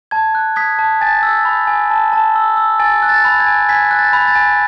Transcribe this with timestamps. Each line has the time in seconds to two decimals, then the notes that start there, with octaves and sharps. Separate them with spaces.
0.11 A5 G#6
0.35 F#6
0.56 D#6 G#6 B6
0.79 A5
1.01 G#5 A6
1.23 E6
1.45 B5
1.67 G#5
1.90 A5
2.13 A5
2.36 E6
2.57 E6
2.79 G#5 A6
3.02 F#6
3.09 A6
3.25 B5
3.40 G#6
3.47 G#5
3.69 G#5 G#6 B6
3.91 F#6
3.99 A6
4.13 B5
4.28 A6
4.35 G#5